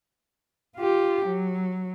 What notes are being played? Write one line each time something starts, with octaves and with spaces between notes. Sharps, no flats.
F4 G4
F#3